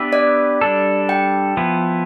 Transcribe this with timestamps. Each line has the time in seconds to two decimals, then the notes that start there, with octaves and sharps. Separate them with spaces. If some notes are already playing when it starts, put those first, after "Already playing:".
Already playing: B3 D4 G4 B4 E5
0.13 D5
0.61 G3 D4 A4
1.09 G5
1.57 F3 B3 E4